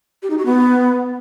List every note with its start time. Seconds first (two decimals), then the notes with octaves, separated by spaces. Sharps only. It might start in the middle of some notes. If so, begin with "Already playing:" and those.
0.23 G4
0.30 D#4
0.38 F#4
0.46 B3